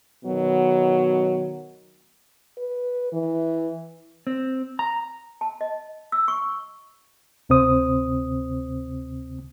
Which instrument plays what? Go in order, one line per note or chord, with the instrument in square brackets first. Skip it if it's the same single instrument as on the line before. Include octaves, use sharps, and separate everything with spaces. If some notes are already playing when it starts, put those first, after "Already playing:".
[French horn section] B2 D#3 F#3 B3
[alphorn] B4
E3
[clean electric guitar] C4
A#5
[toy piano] A5
D#5
E6
C#6
[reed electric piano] D2 C3 C4 C5 D#6